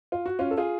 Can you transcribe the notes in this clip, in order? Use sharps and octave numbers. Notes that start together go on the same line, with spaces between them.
F4
F#4
C#4 F4
A4
F4 G#4